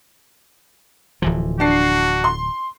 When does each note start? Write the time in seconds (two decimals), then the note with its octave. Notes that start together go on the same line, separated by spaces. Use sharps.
1.22 D1 E3 F3
1.60 D4 F#4 C7
2.24 C6